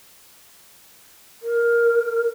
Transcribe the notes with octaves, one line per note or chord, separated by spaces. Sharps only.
A#4